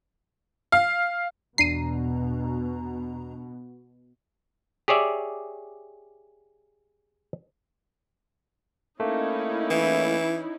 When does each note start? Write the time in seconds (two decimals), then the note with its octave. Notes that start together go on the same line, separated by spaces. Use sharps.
0.72 F5
1.58 E2 B2 D4 A#5 C7 D#7
4.88 G4 G#4 C#5 D5 E5
9.00 A3 A#3 C#4 D#4 E4
9.70 E3